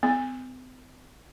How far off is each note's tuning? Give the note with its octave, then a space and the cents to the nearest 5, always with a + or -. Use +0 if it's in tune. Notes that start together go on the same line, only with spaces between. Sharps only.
C4 -45